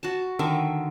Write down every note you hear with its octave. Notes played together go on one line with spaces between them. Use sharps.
F#4 A5
D3 D#3 E5